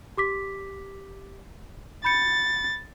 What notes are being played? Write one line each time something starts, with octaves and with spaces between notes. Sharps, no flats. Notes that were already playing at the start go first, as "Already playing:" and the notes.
G4 D6 B6
B5 G6 A6 C#7